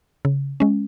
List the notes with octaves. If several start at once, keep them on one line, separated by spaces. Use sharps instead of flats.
C#3
G#3 C#4